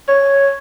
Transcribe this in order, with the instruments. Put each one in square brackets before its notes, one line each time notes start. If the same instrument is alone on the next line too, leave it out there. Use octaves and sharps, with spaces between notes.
[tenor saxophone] C#5